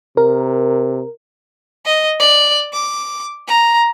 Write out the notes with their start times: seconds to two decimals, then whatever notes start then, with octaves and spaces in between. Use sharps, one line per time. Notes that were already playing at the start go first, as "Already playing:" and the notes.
0.17 C3 A#4
1.85 D#5
2.20 D5
2.73 D6
3.48 A#5